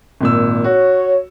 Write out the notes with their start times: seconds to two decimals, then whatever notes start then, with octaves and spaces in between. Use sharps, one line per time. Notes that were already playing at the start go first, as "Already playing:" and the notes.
0.21 G#1 A#2 E6
0.64 F#4 C#5